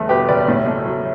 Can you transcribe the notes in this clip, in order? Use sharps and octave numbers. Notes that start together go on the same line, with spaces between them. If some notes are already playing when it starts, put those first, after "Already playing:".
Already playing: G1 E2 A3
B2 G4 B4
F#1 B4 D5
A2
A3
F#3